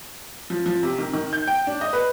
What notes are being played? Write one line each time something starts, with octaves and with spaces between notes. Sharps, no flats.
F3
F3
C3
D#3
D#3
G6
G5
D4
D#5
B4